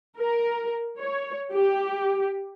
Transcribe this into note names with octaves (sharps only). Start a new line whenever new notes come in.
A#4
C#5
G4